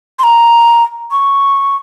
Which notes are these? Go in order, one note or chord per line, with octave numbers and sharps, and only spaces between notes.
C6
A#5
C#6